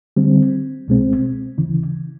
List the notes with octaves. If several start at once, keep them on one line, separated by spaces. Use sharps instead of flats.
D3 G3 C4
C2 B2 G#3 C4
D2 C#3 E3